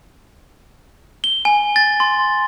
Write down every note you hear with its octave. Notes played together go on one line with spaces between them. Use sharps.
G7
G#5
A6
C6